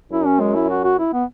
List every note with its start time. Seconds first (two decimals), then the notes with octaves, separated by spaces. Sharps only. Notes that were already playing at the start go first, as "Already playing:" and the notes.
0.12 F#2 E4
0.26 C#4
0.40 G#3
0.55 E4
0.70 F#4
0.84 F#4
0.99 E4
1.13 B3